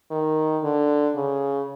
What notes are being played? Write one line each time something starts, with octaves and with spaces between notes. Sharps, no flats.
D#3
D3
C#3